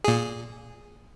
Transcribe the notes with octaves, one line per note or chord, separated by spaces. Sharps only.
A#2 G#4